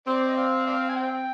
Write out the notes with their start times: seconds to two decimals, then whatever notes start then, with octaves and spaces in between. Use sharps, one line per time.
0.07 C4 D5
0.27 D#5
0.37 D5 F5
0.66 D5 F5
0.89 G#5
0.96 G5